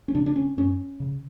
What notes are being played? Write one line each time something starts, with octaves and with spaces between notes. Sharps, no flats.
C#4
C#3 D4
D4
C#4
F#2 C#4
C#3